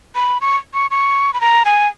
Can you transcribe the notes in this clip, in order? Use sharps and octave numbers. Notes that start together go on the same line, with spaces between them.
B5
C#6
C#6
C#6
B5
A#5
G#5